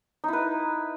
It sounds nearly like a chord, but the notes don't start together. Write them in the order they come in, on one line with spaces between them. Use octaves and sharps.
D#4 E4 B4